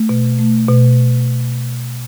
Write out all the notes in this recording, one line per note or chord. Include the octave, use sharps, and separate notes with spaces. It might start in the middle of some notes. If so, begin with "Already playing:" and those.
Already playing: A3
B2
A3
B2